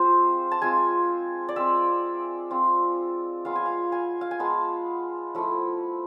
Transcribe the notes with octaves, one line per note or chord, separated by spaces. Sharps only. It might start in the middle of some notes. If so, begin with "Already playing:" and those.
Already playing: G#3 C4 F4 C5
A5
G#3 C4 F4 G#5
D5
G#3 C4 F4 E5
G#3 C4 F4
G#3 B3 F4 F5
G#5
F5
G#5
F5
G#5
G#3 B3 F4 A5
F3 A3 E4